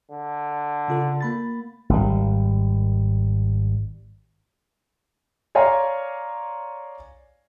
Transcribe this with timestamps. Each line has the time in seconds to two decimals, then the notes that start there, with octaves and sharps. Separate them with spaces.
0.11 D3
0.88 C#3 F4 A4
1.21 A#3 B5 A6
1.89 G#1 G3
5.55 C#5 D5 F5 G#5 A#5 C6